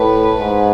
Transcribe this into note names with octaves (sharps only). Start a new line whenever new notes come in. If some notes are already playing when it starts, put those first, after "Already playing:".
Already playing: A2 B4
G#2